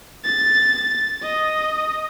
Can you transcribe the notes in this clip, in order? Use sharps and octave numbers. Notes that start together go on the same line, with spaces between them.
A6
D#5